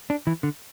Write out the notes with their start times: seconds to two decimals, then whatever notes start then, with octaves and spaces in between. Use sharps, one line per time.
0.10 D4
0.27 E3
0.43 D3